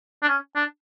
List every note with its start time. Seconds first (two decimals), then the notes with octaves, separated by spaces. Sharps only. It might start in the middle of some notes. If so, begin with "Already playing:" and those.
0.22 D4
0.29 C#4
0.56 D4